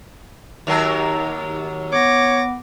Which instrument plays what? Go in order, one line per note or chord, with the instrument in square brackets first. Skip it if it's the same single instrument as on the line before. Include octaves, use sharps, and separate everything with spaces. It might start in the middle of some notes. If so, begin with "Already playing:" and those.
[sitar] D#2 F#3 A#4
[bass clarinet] B3 [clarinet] C#5 [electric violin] D6 A#6